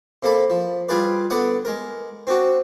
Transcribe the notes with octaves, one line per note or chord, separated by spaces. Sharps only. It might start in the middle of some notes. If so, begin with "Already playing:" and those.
C3 A#3 A4 B5
F3
G3 F4 G#4 B4 D5
D3 B3 D5 F#5 D#6
G#3 A#4
C4 D4 F#4